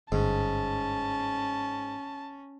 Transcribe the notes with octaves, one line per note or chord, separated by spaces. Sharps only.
G1 G#2 C#4 A5